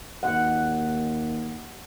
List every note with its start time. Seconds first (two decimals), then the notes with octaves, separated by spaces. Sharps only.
0.23 D#2 F#5